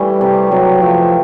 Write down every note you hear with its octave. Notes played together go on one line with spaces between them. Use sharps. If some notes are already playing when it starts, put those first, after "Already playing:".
Already playing: E3 G3 A3
C3
C3 F#3
F3 A3